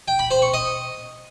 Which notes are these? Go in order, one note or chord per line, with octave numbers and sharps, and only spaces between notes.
G5
B5
C5
C#6
D#5